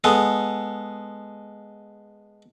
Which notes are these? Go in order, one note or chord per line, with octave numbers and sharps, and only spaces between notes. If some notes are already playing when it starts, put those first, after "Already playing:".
G#3 B3 G#4 A4